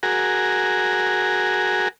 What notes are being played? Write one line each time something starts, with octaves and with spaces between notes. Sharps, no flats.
F#4 G#4 A#4